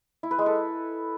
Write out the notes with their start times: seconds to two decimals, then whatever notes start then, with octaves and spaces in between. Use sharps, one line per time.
0.23 E4
0.31 B4
0.38 G#3
0.46 A4